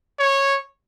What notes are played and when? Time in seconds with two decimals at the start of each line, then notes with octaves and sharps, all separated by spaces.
0.19 C#5